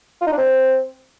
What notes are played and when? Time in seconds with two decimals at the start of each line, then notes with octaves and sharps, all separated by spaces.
0.22 F4
0.27 D#4
0.32 D4
0.38 C4